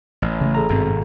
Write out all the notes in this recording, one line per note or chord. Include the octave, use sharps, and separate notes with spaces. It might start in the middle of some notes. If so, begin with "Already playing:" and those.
A1
C#3 A3
G#4 A4 A#5
G#1 G2 B2 C4